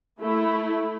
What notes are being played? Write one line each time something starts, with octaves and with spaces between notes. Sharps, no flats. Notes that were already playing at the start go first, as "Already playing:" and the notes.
A3 E4